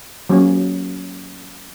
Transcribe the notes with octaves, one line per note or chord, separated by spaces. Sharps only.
F#3 A#3 C#4